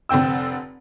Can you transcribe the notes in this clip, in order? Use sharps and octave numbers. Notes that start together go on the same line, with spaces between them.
F1 D3 C4 G5 E6